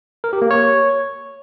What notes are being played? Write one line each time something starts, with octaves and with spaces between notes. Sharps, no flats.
A#4
G4
A#3
C#5